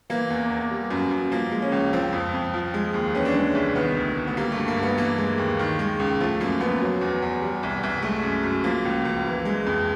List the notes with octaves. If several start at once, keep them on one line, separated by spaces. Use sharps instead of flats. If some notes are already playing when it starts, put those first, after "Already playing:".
E3 A#3
E2
E2
G3
F#2
F#2
F3 A#3
G#3
C#4
C#2
F3 C4
F2
F2
F3
G#3
D#2
E3 C#4
D4
G#3 C#4
C2
D#3 B3
D2
D2
B3
G3 A#3
A3
G2
A#3
G2
B3
E3 A#3
G#3
D#2
D#3
G#3
C#2
F3 A3
F#2 A#3
F#2 B3
F#3
E2
E2
G3
C2
C2
G#3 A3
F#2
F#2
F3 A#3
C#2
C#2
E3
G#3
F2